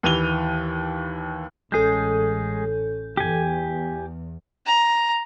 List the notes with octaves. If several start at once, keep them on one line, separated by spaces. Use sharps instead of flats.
D#2 E3 D#7 F7 G7
A1 G#3 C#4 G#4 A4 G6
E2 G4 G#5
A#5